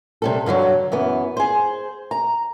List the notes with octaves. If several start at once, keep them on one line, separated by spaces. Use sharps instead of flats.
C3 G3 A4
G2 D3 F3 F#3
F#2 E3 B3
G#4 C5
A#5